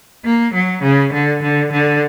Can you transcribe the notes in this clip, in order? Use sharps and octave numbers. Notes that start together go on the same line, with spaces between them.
A#3
F#3
C#3
D3
D3
D3